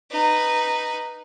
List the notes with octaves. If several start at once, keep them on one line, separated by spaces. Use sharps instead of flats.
D#4 B4